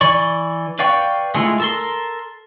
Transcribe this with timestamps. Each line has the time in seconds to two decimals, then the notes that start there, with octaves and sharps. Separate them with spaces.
0.01 E3 D5 C#6
0.79 B4 D5 F5 G5 C#6
1.35 G#3 A3 E4 F4
1.60 A4 A#4 C6